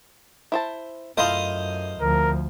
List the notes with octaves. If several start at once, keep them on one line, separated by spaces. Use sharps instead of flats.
E4 C5 A5
F#2 A3 E4 F4 C5 D#5 F5
D2 F3 A#4